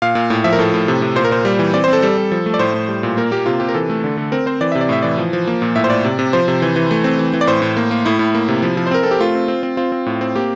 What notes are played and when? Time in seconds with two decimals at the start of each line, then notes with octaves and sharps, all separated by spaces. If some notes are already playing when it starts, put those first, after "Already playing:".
0.02 A#2 F5
0.15 A#2
0.30 A2
0.44 F3 E5
0.53 A#4
0.59 A2 A4
0.74 A2
0.88 C3
1.02 C3
1.16 A#2 C5
1.25 A#4
1.31 A#2 C5
1.45 G3
1.59 E3
1.74 C4 D5
1.84 C5
1.88 C4 A4
2.02 G3 A4
2.17 G3
2.32 F3
2.46 A3
2.54 D5
2.59 A2 C5
2.74 A2
2.88 G3
3.03 A#2
3.17 A#3 A#4
3.31 A#3 G4
3.46 C3 F4
3.60 C3 G4
3.68 A#4
3.74 E3 A4
3.90 A3
4.04 D3
4.17 D3
4.32 C4 A#4
4.46 C4 C5
4.61 E3 D5
4.72 C3 E5
4.81 D5
4.89 A2 E5
5.03 E3 D5
5.18 F3
5.33 F3
5.47 A#3
5.62 A#2
5.76 A2 E5
5.84 C5
5.90 A2 D5
6.04 C3
6.19 C3
6.33 F3 C5
6.48 C3
6.62 E3
6.76 E3
6.91 A3
7.04 C4
7.19 E3
7.34 E3
7.41 D5
7.47 A2 C5
7.62 A2
7.77 A#3
7.91 A#3
8.05 A2 E4
8.19 A2
8.35 A#3
8.48 C3
8.62 F3
8.77 F3
8.87 C5
8.91 C4 A#4
9.03 C4 A4
9.11 G4
9.19 A3 F4
9.35 C4
9.48 C4
9.63 C4
9.77 C4 F4
9.92 C4
10.06 A2
10.21 C4
10.36 A#3 G4